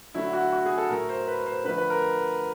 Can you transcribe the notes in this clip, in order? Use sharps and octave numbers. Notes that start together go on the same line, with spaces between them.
D3 F#3 A3 E4
F#4
F#4
G#4
A4
A2 F#3 A3 A#4
C5
B4
C5
D3 F3 A3 B4
B4
A#4